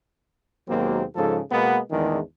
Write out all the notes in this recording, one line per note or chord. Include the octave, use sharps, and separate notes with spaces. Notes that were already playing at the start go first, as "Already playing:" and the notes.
D#2 B2 F#3 G#3 A#3 C4
G#2 C#3 F3 A4
B2 G#3 A#3 B3
A1 E2 D#3 E3 G#3 D4